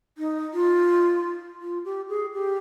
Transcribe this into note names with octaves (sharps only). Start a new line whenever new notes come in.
D#4
F4
F4
G4
G#4
G4